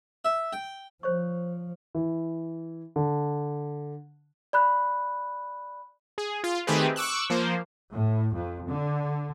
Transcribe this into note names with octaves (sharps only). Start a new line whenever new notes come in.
E5
G5
F3 C5 C#5 C#6
E3
D3
D5 B5 F#6
G#4
F4
D#3 A3 C4 G4 G#4 B4
C#6 D6 E6 F#6
F3 A#3 C5
A2
F2
D3